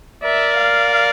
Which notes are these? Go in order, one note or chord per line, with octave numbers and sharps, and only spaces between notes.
A#4 D5 E5
F5